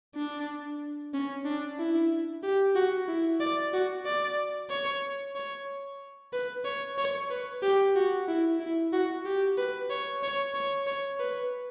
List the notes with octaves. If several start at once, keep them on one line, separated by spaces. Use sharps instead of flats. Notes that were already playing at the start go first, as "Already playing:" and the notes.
D4
C#4
D4
E4
G4
F#4
E4
D5
F#4
D5
C#5
C#5
B4
C#5
C#5
B4
G4
F#4
E4
E4
F#4
G4
B4
C#5
C#5
C#5
C#5
B4